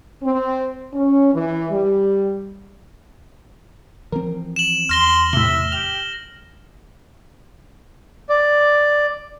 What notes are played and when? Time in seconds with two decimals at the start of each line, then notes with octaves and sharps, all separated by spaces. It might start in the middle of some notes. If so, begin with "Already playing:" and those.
0.23 C4
0.93 C#4
1.33 E3
1.71 G3
4.12 E3 F3 C4 A#4
4.56 E7 F#7
4.89 E2 C6 F6 A#6 G7
5.33 A2 C3 E5 G7
5.72 G4 F6
8.29 D5